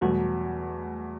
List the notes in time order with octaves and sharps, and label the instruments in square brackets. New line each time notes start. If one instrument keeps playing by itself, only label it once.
[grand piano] E2 B2 F#3 [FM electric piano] G3 A3